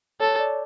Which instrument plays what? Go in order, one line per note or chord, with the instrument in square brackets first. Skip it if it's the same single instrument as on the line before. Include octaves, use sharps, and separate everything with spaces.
[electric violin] A4 [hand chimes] C#5
[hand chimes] D5